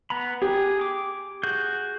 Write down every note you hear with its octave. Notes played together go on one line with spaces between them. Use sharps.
B3 A#5 B5
G4 G#4
D6
F#4 G#4 G6